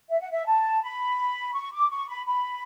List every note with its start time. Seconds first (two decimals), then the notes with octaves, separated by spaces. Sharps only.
0.10 E5
0.21 F#5
0.31 E5
0.46 A5
0.83 B5
1.54 C#6
1.73 D6
1.91 C#6
2.09 B5
2.26 B5